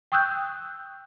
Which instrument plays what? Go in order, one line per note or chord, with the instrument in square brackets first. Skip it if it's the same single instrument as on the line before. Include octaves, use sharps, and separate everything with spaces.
[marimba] G5 C#6 D#6 E6 F#6 G6